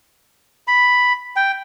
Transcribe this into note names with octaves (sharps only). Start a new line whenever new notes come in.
B5
G5